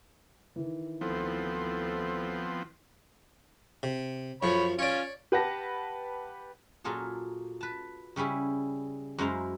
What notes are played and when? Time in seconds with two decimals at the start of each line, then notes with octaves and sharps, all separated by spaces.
0.56 D#3 E3
1.01 D2 F3 B3 C4 E4 A4
3.83 C3
4.43 F#2 F3 C#5 B5
4.79 C#4 F4 C#5 D5
5.32 G4 B4 F#5 A5 A#6
6.84 A#2 F#3 F4 G#4 A4
7.61 B4 A5
8.16 C#3 G3 C#4 E4 G#4
9.18 F#2 G#3 E4 C5 F5 A#5